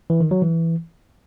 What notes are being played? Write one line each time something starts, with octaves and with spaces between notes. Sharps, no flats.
E3
D#3
F#3
E3